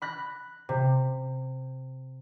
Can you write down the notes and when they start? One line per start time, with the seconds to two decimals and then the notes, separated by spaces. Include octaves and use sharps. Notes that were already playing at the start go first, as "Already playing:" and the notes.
0.02 B5 F#6 A#6
0.69 C3